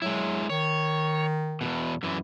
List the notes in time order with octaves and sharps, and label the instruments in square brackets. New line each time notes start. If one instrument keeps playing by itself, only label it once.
[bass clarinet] F#3 [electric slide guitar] G#3 E4
[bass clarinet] D#3 [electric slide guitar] C#5
[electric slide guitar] E2 G2 B2
F#2 E3